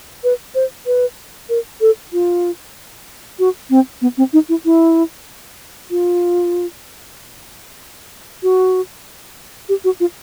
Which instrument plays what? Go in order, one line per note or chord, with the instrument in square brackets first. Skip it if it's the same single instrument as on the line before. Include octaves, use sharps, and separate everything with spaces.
[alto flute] B4
C5
B4
A#4
A4
F4
F#4
C4
B3
C4
D#4
E4
E4
F4
F#4
G4
F#4
F4